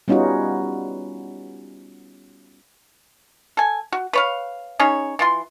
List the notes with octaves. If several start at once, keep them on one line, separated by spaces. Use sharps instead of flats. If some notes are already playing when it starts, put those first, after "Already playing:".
G3 B3 C#4 D#4 F4 F#4
A4 G#5
F#4
B4 C#5 F5
C#4 D#4 G#4 C#5
E3 F4 C6